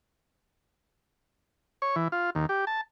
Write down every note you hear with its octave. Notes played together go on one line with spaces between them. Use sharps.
C#5
E3
F4
D#2
G4
A5